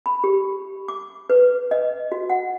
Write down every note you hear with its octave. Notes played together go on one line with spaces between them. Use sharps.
B5
G4
D6
B4
D#5
F#4
F#5